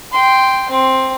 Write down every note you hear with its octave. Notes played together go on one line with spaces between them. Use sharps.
G5 C6
C4